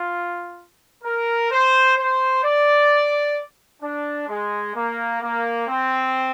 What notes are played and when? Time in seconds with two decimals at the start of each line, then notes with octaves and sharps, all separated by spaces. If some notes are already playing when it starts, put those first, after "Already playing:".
Already playing: F4
1.04 A#4
1.51 C5
1.97 C5
2.43 D5
3.82 D4
4.28 G#3
4.75 A#3
5.22 A#3
5.68 C4